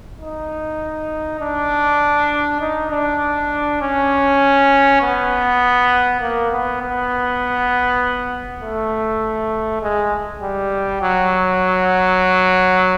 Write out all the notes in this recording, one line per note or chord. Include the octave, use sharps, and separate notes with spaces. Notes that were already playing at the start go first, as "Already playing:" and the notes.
D#4
D4
D#4
D4
C#4
B3
A#3
B3
B3
A3
G#3
G3
F#3